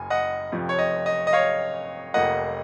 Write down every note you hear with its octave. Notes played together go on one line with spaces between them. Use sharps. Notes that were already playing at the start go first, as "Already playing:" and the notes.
Already playing: F#1 F#2 G#5
D#5 F#5
F1 F2 F3
C#5
D#5
D#5
D#5
C#5 F5
F1 F2 F3 A#3 D#5 F#5